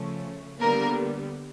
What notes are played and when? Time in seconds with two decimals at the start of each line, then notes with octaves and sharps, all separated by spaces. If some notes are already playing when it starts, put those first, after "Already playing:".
Already playing: C#3 F3 A3 C#4
0.60 D3 G3 A#3 B3 A#4